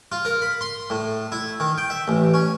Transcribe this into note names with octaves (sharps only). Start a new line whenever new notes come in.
F4
A#4
B5
C6
A2
E4
D#3
G5
E5
A1
C#4